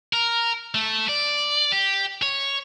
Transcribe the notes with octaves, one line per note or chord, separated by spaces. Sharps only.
A#4
A3
D5
G4
C#5